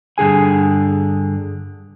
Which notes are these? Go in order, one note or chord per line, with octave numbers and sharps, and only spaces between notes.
G2 D3 G#4 G#5